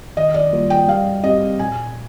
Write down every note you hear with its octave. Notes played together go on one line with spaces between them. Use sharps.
D#3 D#5
D5
G3 A#3 F4 A#4
G5
G3 F5
C4 G4 D#5
A#2 G#5